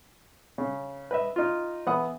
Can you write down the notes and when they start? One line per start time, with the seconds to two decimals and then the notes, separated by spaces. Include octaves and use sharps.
0.58 C#3
1.11 B4 D#5 E5
1.36 D#4 F4
1.86 E3 B3 B4 F#5 D#6